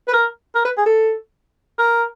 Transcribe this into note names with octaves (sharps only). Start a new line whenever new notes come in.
B4
A#4
A#4
B4
G#4
A4
A#4